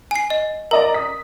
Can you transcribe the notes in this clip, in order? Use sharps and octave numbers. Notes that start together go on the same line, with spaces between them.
G#5 C7
D#5
A#4 D5 D#5 A#5
D#6 B6